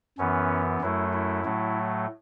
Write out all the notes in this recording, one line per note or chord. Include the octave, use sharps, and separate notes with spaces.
F#2 E3 B3 C#4
F#2 F#3 A3 E4
E4
A2 F#3 A3